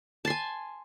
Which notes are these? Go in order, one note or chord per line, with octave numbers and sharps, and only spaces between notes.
G#5 A5 C6